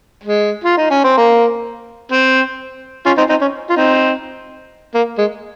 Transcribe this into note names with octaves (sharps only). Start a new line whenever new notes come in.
G#3
F4
D#4
C#4
C4
A#3
C4
C#4 F4
C4 D#4
C4 D#4
C#4
F4
C4 D#4
A#3
G#3